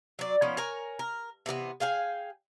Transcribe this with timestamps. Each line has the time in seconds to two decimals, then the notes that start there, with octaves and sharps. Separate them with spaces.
0.19 F#3 D5
0.42 F3 B3 C#4 D#4
0.57 A#4 C#5 G#5 A#5
0.99 A#4
1.46 C3 E3 A#3 B3
1.80 G#4 F5 G5 G#5